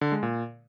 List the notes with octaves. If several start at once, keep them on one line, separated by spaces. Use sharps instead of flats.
D3
G#3
A#2